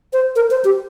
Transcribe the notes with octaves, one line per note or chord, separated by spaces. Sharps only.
C5
A#4
C5
G4